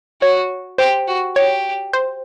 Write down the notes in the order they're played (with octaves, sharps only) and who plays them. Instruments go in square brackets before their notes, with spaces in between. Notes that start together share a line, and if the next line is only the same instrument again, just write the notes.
[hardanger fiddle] F#4 [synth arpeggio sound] C#5
[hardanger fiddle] G4 [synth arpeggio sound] C5
[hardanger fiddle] F#4
[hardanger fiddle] G4 [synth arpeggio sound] C#5
[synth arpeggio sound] C5